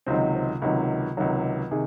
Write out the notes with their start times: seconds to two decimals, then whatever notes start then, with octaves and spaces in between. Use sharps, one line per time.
0.06 C#2 C3 D#3 F#3 C4
0.35 C4
0.62 C#2 C3 D#3 F#3
1.17 C#2 C3 D#3 F#3
1.71 C3 D#3 G#4